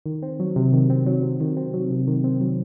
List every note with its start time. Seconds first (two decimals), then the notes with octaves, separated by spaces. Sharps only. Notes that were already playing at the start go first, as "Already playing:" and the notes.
0.06 D#3
0.22 C4
0.40 F#3
0.56 C3
0.73 D#3
0.90 C4
1.06 F#3
1.23 C3
1.40 D#3
1.57 C4
1.74 F#3
1.91 C3
2.08 D#3
2.24 C4
2.41 F#3